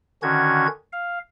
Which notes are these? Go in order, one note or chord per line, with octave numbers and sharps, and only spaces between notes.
D3 D#3 C#4 F#4 G#6
F5